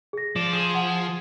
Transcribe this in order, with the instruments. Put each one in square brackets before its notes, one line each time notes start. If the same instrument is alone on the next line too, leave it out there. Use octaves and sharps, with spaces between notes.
[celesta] G#4 A#6
[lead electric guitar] F3 [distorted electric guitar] D5 [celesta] E7
[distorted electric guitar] G#4 [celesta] E7
[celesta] F#5